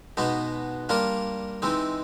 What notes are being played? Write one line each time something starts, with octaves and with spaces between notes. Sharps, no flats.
B2 G#3 B3 D#4 F#4
G3 A#3 D4 F4 A#4
E3 G#3 C4 D#4